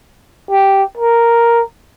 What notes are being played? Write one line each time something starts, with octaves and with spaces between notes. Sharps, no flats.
G4
A#4